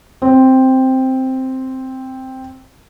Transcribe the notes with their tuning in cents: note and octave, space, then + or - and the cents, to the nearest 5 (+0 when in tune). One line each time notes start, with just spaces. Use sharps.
C4 +0